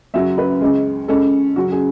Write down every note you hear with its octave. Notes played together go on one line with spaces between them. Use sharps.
F#2 C#3 F#3 C#4 E5
B4
C#2 C#3 G#3
C#3 G#3 C#4 A4
F#2 C#3 F#3 C#4 F#4
G#4